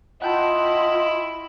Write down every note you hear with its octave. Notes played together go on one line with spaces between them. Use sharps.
E4 F4 D#5 F#5 G5 A5